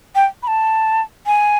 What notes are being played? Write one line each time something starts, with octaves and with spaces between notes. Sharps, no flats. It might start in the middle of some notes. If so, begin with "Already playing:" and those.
G5
B5
A5
G#5